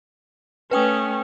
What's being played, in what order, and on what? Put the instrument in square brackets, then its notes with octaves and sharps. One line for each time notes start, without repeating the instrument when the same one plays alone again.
[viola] A3 C#4 [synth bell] B4 G5 D#6